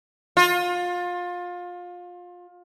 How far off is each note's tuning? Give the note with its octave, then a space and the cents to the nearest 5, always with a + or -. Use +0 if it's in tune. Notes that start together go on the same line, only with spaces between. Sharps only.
F4 +25